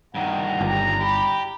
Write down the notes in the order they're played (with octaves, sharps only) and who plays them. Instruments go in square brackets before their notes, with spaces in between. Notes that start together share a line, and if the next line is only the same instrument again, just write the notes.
[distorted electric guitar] G2 D#3 [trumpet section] D4 E4 A#5 [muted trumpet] F#5
[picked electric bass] G1 [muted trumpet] G4
[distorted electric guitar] G4 [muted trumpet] B5